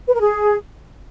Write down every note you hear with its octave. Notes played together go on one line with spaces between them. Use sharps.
B4
A#4
G#4